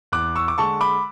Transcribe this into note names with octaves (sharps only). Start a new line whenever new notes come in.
E2 D6 F#6
C#6 E6
D6
D3 G#3 A5 C#6
B5 D6